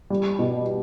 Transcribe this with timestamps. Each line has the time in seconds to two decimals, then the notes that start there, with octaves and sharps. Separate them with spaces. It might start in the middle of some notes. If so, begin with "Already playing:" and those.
0.10 G3
0.39 B2